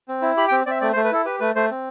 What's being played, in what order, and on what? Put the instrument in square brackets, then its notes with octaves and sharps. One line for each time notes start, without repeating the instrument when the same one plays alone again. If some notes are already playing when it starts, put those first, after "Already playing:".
[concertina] C4
E4
G4 B5
G5
C4
C4 D5 E5
A3 D5
C5
A3
B4
E4 A4
G4 B4
A3 B4
A3 C5
C4